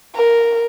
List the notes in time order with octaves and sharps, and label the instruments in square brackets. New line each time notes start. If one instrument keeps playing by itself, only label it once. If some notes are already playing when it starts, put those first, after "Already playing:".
[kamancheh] A#4